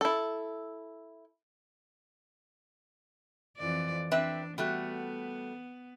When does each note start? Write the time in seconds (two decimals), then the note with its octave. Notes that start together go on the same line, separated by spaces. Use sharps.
0.01 E4 A4
3.57 F2 E3 D5
4.11 C4 D4 B4 E5
4.58 G3 A3 B3 F#4